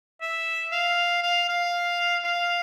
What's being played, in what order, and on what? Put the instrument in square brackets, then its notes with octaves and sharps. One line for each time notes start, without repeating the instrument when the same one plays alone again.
[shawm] E5
F5
F5
F5
F5